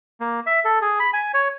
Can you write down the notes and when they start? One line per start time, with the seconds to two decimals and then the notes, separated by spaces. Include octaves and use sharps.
0.20 A#3
0.46 E5
0.65 A4
0.82 G#4
1.00 B5
1.13 G#5
1.34 C#5